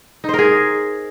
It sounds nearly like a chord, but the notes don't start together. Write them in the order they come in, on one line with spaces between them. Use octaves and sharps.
D#4 C5 A#4 G#4